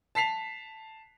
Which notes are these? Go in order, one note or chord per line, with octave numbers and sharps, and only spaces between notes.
A5 B6 C7 F7